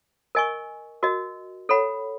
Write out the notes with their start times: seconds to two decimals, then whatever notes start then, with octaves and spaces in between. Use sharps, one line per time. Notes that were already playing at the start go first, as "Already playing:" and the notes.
0.35 A#4 D#5 G#5 C#6
1.03 F#4 A#4 D#5
1.69 A4 C#5 F#5 B5